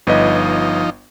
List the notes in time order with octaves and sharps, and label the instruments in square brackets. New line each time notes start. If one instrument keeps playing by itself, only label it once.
[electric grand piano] G1 B4 D#5 [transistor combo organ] F3 D#4